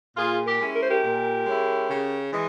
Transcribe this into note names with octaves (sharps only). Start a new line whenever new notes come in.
A#2 F4 G#4
G4 A#4
G#3 C#4 E4
A#4
C5
G4 A#4
A#2
G#3 C#4 E4
C#3
E3 G#3